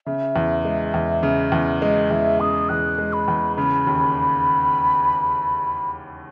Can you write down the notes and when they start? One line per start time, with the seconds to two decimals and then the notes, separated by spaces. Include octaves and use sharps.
0.06 C#3 E5
0.36 E2
0.65 G#3
0.94 E2
1.23 C#3
1.52 E2
1.82 G#3 D#5
2.11 E2 E5
2.40 C#3 D#6
2.69 E2 F#6
2.98 G#3
3.13 B5
3.28 E2
3.57 C#3 B5
3.87 D#2